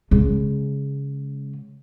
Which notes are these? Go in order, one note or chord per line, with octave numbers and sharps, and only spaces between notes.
C#3 G#3